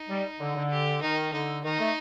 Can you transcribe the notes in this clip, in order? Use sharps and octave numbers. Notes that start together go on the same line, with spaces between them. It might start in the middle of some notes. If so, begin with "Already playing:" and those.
Already playing: D#4
G3
D3
D3
G4
D#3 D#4
D3 D#4
D#3 D#4
A3